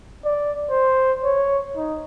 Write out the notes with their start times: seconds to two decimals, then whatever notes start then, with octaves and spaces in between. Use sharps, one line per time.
0.25 D5
0.71 C5
1.24 C#5
1.76 D#4